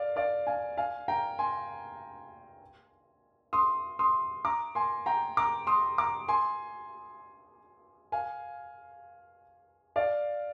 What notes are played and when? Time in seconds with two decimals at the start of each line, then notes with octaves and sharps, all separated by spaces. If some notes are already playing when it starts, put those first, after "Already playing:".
Already playing: D5 F5
0.16 D5 F5
0.47 F5 G#5
0.77 F5 G#5
1.08 G5 A#5
1.39 G#5 C6
3.53 C6 D#6
3.99 C6 D#6
4.45 A#5 D6
4.75 G#5 C6
5.06 G5 A#5
5.37 A#5 D6
5.67 C6 D#6
5.98 A#5 D6
6.28 G#5 C6
8.12 F5 G#5
9.96 D5 F5